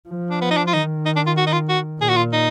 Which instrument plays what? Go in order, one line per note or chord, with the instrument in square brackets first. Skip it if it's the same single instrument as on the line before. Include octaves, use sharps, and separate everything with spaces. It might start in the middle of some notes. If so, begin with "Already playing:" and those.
[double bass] F3
[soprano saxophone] D4
B3
D#4
D4
F4
[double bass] D#3 [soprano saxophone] D#4
[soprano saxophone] D#4
D4
F4
F#4
D#4
F4
F#4
[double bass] A#2 [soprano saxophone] G#4
[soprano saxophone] F#4
F4
D#4